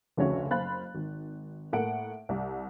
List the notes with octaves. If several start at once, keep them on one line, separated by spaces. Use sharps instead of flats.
F1 D2 C#3 F#4 C#5 E5
F#1 C5 F5 B5 F#6 A6
G#1
A2 A#3 A4 F#5 D7
C2